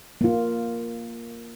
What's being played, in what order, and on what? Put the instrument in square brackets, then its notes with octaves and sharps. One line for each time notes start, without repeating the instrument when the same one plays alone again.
[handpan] A#3 F4